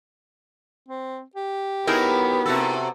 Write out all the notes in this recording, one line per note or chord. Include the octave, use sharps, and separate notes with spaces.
C4
G4
F#3 B3 D#4 E4 G#4 A#4
C3 F#4 A4